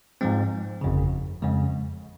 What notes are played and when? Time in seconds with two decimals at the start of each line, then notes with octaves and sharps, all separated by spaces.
0.21 G#2 F3 G#3 C4
0.81 G1 F2 C#3
1.42 F2 C#3 G#3